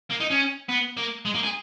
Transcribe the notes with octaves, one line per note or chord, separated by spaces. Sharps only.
A#3
D#4
C#4
B3
A#3
G#3
A#3
G#4